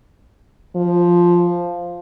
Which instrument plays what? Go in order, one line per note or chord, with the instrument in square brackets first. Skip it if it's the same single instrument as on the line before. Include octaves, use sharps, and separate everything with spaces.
[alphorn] F3